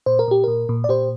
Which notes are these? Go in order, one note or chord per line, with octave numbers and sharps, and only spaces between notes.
A#2 C5
A#4
A#2 G4
A#2 A#4
A#2
D5
A#2 G4 C5